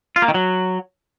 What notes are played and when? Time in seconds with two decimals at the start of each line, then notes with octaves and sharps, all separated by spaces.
0.16 F4
0.22 A#3
0.28 D#3
0.34 F#3